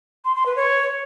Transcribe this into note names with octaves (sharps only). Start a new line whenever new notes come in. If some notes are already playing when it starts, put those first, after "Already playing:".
C6
C6
B4
C#5